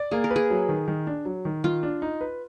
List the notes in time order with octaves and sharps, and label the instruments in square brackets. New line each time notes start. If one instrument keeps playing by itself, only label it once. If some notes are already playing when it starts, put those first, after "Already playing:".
Already playing: [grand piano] D5
[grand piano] A#3 [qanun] G#4
[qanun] A#4
[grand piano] B4
[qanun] G#4
[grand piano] F#3
D#3
D#3
D4
F#3
D#3
[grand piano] D#3 [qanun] F4
[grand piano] D4
D#4
B4